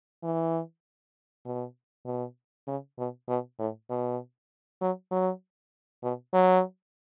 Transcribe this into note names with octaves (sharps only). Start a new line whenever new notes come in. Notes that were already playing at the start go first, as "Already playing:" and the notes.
E3
B2
B2
C#3
B2
B2
A2
B2
F#3
F#3
B2
F#3